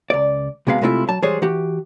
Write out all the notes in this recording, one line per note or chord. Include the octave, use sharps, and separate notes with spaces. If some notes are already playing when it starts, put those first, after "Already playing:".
C#2 D5
B1 C3 G#3 B3 F5
C3 G#3 A3 C4 E4 F4
F#3 A5
E3 G3 G#3 G#4 C5 C#5
E3 F#4 G4